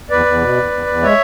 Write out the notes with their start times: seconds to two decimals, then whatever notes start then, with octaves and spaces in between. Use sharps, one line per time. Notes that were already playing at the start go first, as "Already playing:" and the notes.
0.11 E2 B4 D5
0.26 E2
0.41 B2
0.57 E2
0.72 E2
0.86 E2
1.02 G#3 C#5 E5